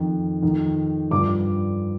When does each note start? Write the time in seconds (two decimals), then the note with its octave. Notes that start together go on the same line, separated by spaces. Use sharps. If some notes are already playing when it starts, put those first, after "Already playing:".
Already playing: F2 D#3
0.42 F2 D#3
1.11 G2 D3 F3 D6